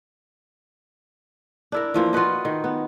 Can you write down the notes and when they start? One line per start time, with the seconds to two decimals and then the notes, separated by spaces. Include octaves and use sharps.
1.72 D4 E4 A#4
1.94 E3 F3 A#3
2.13 F4 F#4 B4 D#5
2.45 D#3
2.64 B3